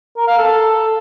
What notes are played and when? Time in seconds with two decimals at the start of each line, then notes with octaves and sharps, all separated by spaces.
0.17 A#4
0.28 F5
0.38 A4